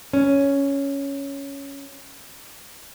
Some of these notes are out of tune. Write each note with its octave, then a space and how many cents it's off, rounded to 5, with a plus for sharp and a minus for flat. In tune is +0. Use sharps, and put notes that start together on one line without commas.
C#4 +5